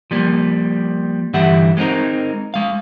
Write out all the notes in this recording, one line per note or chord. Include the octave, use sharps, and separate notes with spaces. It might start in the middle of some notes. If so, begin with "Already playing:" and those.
F3 G3 A#3
G2 D3 E3 G4 E5 F#5
G#3 B3 C4 D#4 A#4
G#3 F5